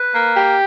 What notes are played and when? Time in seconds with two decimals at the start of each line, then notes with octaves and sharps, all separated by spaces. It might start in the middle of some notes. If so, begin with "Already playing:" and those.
Already playing: B4
0.13 A#3
0.35 G4